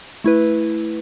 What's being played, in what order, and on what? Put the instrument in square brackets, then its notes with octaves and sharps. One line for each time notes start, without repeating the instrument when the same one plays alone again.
[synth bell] A3 E4 B4